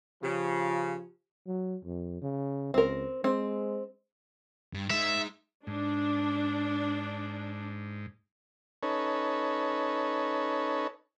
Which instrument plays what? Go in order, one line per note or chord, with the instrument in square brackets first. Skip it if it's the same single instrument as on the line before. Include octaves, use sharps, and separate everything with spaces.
[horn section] C#3 [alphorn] F3 [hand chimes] G4
[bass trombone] F#3
F2
C#3
[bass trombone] C#2 [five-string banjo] C4 A#4
[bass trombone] G#3 [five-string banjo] C4
[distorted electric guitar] G2
[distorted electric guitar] G#3 D#4 [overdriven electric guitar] E5
[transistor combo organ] G#2 [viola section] D4
[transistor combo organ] C#4 D#4 A4 B4 C#5